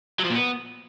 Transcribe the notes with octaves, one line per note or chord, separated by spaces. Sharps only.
F#3
F3
A#2
B3